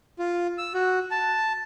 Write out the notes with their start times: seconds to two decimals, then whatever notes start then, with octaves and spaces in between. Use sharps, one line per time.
0.19 F4
0.58 E6
0.74 F#4
1.11 A5